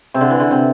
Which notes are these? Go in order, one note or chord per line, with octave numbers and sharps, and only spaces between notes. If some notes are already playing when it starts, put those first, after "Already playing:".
C3
D3
E3
D3
C3